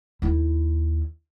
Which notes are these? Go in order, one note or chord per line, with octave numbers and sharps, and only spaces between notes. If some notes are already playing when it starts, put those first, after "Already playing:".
D#2 E4